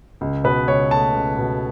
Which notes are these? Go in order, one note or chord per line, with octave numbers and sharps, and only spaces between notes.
C#2
B2 B4
C#2 C#5
A3 A5
C#2
B2